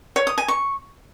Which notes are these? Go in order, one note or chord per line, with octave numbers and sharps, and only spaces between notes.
C#5
D#6
G#5
C#6